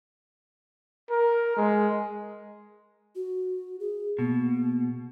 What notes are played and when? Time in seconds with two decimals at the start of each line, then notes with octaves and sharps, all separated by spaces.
1.11 A#4
1.57 G#3
3.15 F#4
3.80 G#4
4.19 B2 A#3